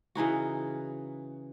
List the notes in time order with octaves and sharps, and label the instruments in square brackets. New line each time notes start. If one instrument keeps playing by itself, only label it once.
[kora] C#3 E3 D#4 F#4